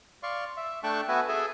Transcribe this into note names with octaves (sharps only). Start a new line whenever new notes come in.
D5 F5 C6 C#6
E5
A3 D4 G5 A5 C#6 F#6
B3 F#4 B4 E5 F#5 G#5
G#4 A4 E5 G#5